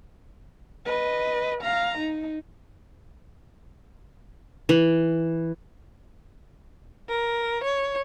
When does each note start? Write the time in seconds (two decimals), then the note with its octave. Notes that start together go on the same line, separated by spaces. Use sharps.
0.86 B4 D#5
1.62 F5 A#5
1.99 D#4
4.69 E3
7.09 A#4
7.63 C#5